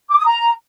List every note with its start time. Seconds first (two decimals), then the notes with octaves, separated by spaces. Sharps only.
0.10 D6
0.18 D#6
0.25 A#5